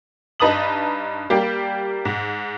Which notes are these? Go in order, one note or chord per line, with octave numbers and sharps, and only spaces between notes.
G2 D#4 B4 A5 D#6 F#7
G3 A#3 G4
G#2